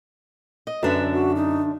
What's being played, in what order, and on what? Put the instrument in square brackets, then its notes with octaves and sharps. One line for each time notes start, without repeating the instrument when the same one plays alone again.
[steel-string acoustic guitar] D#5
[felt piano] F#2 [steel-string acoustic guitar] D3 D4 E5 [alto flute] B4
[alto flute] F#4
D#4